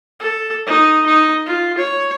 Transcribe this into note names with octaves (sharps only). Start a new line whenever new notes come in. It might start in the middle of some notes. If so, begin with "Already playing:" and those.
A4
D#4
D#4
F4
C#5